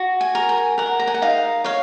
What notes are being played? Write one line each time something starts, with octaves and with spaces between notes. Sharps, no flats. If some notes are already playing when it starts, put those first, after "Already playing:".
Already playing: F#4
G#5
A#4
G#5
A#4 F#5
A#5
G#5
F#5
D#4 F5
C#5 F5